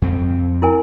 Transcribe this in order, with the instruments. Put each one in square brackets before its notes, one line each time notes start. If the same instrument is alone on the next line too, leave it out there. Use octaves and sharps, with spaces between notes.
[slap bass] F2 C4
[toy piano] E4 A#4 G#5